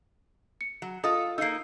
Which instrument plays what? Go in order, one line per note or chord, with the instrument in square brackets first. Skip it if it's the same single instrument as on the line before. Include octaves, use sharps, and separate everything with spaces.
[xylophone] C#7
[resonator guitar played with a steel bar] F#3
[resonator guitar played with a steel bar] F4 A4 [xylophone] D#5 D#6
[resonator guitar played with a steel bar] A#3 D#4 [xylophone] E6 C7